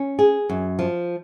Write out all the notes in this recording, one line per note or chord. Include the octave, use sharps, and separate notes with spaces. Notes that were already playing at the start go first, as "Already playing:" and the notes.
Already playing: C#4
G#4
F#2
F3